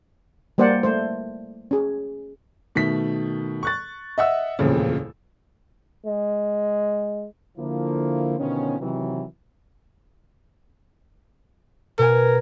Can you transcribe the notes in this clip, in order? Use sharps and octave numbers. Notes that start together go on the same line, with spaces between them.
G3 A#3 C5 D5 F#5
A3 C5
C#4 G#4
B2 D#3 A3 B6
C#6 F#6 A6
D#5 E5 F#5 E6
D#1 A1 F2 A#2 C#3
G#3
D3 F3 A#3 E4
B2 D3 D#3 F3 B3 C#4
C3 D#3 E3 F#3
B2 A#4 G#5